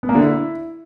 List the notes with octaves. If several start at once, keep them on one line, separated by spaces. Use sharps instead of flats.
B3
A#3
D3
E4